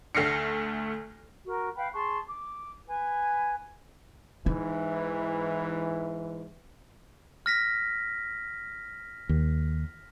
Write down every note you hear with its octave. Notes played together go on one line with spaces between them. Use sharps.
D2 A3 F6 A#6 C7 C#7
F#4 A#4
B4 F5 G5 B5
G#4 A5 C6 C#6
D6
B4 G#5
G#2 E3 D#4
F6 A#6 B6
D#2